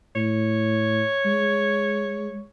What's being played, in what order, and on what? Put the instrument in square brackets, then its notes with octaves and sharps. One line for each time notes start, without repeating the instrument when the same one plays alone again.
[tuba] A2 [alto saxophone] C#5
[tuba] G#3